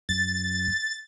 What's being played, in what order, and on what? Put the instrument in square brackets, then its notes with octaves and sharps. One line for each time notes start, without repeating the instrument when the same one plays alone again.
[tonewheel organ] F#2 [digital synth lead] A6